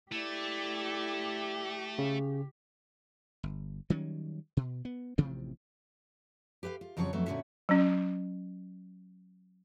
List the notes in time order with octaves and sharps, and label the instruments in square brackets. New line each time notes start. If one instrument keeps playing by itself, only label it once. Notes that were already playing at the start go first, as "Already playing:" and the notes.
[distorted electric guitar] A3 [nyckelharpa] E4 D5 [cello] G4
[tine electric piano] C#3
[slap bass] G1
D#3 F#3 G3 C#4
B2
B3
A1 C3 F3 C4
[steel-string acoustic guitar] G4 B4 E5 F5
F4
F2 C#3 F3 F#3 G4 C#5
F2 F#3 A3 B3 D4
A#2 D3 C#4 F#4 E5
[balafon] F#3 C#4